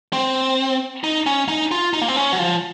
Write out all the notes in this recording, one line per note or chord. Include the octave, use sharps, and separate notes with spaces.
C4
D#4
C#4
D#4
F4
D#4
A#3
C4
C#4
F#3
F3